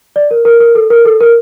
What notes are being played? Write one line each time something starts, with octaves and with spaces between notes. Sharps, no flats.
D5
A#4
A#4
A#4
A4
A#4
A4
A#4